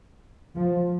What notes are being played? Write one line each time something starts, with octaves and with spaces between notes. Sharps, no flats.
F3